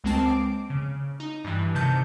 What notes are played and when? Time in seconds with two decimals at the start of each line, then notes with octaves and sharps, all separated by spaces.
0.04 C#2 G#3 A#3 C4 A5 C7
0.26 D6 D7
0.70 C#3
1.20 D#4
1.44 G2 E3
1.75 C3 D#3 A5 G6 C#7